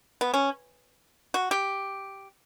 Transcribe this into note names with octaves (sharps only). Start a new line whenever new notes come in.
B3
C#4
F#4
G4